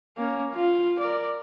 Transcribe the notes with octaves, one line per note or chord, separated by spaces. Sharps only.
A#3 C#4
F4
A#4 D5